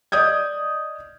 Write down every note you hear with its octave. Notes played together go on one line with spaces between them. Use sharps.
D5 D#5 D#6 G6 G#6